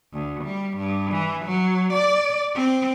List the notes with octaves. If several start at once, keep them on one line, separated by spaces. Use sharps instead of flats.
D2
G3
G2
E3
F#3
D5
C4